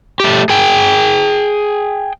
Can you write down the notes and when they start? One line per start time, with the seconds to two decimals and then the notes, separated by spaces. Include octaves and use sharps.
0.20 A3 G4
0.50 G#4 G5